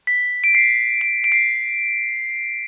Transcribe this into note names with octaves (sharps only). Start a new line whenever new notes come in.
B6
D7
C7
D7
D7
C7